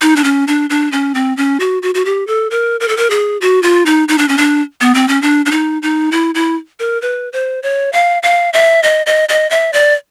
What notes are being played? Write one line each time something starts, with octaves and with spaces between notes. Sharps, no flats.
D#4
D4
C#4
D4
D4
C#4
C4
C#4
F#4
F#4
F#4
G4
A4
A#4
A#4
A4
A#4
G#4
F#4
F4
D#4
D#4
D4
C#4
D4
B3
C4
C#4
D4
D4
D#4
D#4
E4
E4
A#4
B4
C5
C#5
F5
F5
E5
D#5
D#5
D#5
E5
D5